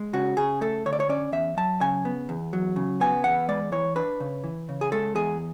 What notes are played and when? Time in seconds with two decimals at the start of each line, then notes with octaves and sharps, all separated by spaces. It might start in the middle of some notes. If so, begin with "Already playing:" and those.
Already playing: G#3
0.13 C#3 F#4
0.37 C#3 G#4
0.61 A3 A4
0.86 D3 C#5
0.93 D5
1.00 C#5
1.09 C#4 D5
1.32 E2 E5
1.57 F#3 A5
1.81 C#3 G#5
2.05 B3
2.29 E2
2.53 F#3
2.76 C#3
3.01 B3 G#5
3.24 E2 F#5
3.49 G#3 D5
3.72 E3 C#5
3.96 D4 B4
4.20 C#3
4.44 E3
4.69 C#3
4.81 G#4
4.92 G#3 A4
5.15 E2 G#4